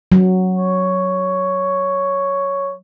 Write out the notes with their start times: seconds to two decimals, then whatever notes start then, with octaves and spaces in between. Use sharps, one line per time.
0.12 F#3
0.56 C#5